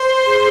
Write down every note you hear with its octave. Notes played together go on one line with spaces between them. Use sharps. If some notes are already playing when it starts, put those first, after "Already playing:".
Already playing: C5
G#4